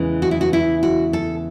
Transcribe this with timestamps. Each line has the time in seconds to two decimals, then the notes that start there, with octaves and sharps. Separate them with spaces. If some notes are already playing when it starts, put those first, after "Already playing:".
Already playing: E2 C#3 E3 G#3 B3
0.22 F#4
0.31 E4
0.41 F#4
0.53 E4
0.83 F#4
1.13 A4